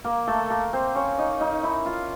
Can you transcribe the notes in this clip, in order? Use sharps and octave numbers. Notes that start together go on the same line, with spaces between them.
A#3 A#4
A3 A4
A#3 A#4
C4 C5
C#4 C#5
D#4 D#5
D#4 D#5
E4 E5
F4 F5